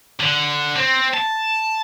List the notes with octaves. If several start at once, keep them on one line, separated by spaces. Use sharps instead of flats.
D3
C4
A5